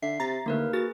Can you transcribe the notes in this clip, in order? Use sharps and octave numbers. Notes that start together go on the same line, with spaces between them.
D3 E5 C7
C3 A#5 A6
D#2 D3 A3 A#3 A#4 B4
F#4 G#4 A6